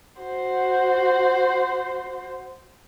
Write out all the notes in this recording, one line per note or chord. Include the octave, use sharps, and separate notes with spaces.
F#4 C5